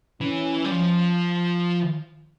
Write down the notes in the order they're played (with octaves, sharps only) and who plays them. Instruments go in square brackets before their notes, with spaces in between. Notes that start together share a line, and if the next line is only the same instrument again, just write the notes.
[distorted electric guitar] E3 [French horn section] C#4
[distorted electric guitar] G3
F3